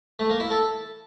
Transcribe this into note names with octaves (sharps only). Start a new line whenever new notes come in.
A3
A#3
E4
A4